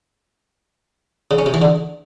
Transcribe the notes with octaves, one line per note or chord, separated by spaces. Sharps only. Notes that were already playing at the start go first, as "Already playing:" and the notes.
C#3
C#4
C3
E3
D3